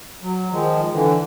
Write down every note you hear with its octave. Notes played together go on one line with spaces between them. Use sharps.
F#3
D#3 F3 G#3
D3 E3